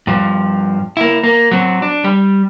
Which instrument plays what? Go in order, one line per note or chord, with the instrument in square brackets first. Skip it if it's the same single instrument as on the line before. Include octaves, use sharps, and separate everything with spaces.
[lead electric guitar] G2 F3
A#3 E4
A#3
F#3 C4
D4
G3